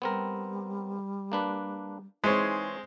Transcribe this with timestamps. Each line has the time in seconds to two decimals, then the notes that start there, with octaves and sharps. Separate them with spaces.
0.02 G3 B3 C4 A#4
1.32 A#3 D4 B4
2.24 E3 G#3 C4 D#4 G#4 C#5